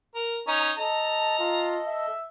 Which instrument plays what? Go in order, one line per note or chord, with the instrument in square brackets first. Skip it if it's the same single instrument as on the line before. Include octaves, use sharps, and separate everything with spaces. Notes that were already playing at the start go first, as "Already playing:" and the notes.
[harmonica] A#4
C#4 D#4 A#5
[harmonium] A4 D#5 [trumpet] A5 [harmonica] A#5
[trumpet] F4
E5